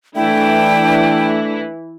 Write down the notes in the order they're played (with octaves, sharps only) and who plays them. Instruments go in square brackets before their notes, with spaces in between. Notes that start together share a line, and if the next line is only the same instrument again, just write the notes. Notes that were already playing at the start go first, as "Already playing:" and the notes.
[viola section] E3 E4 [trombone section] A3 D4 [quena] G5